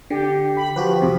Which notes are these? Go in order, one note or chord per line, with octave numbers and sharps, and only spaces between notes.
D3 G4
B5
F3 F#4 G4 B4
F2 C3